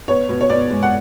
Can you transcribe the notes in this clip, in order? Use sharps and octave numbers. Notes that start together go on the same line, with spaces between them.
B3 C#5
B2
C#5
B2 D5
G#3
F#5